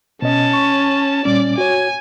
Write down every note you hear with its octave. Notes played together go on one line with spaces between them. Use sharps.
B2 C#4 D#5 A5
C#6
A#2 G3 C#4 D5 D6
F#4 C#5 G#5